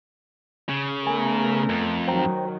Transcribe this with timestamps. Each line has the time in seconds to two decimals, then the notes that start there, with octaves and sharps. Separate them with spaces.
0.69 C#3
1.07 A3 B3 A#4 G#5
1.69 F2
2.08 D#3 F#3 C5 G5 A#5